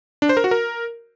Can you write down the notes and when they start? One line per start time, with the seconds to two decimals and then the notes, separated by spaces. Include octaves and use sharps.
0.22 D4
0.29 C5
0.37 A#4
0.44 F#4
0.51 A#4